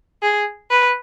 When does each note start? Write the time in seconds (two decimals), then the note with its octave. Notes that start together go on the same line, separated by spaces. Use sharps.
0.22 G#4
0.70 B4